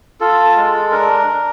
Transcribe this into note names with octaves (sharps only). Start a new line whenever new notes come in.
F4 A4
G#3
D4 A#4
D4